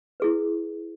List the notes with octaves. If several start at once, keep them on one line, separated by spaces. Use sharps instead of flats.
E4 G#4 B4